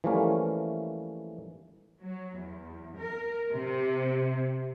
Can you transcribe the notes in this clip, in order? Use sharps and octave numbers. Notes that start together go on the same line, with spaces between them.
E3 F3 G3 A3 A#3 C#4
F#3
E2
A#4
C3